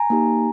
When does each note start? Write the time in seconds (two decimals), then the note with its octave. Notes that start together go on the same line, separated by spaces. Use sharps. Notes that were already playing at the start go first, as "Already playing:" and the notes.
Already playing: G#5 A#5
0.10 A#3 D#4 G4